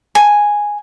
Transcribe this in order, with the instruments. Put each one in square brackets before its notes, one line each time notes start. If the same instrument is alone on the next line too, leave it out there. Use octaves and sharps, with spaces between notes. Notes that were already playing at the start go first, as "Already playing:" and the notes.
[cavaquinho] G#5